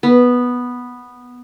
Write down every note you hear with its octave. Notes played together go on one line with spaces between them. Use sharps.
B3